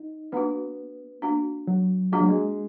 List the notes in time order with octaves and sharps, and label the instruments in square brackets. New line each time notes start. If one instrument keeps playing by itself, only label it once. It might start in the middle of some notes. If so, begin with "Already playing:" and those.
Already playing: [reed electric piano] D#4
[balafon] A#3 D4 F#4 [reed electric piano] B3
[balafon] A#3 D4 F#4
[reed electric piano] F#3
[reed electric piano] G#3 [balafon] A#3 D4 F#4
[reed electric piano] F#3
G#3